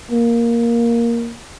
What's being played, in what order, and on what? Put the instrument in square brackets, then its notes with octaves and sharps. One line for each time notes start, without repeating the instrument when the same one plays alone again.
[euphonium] A#3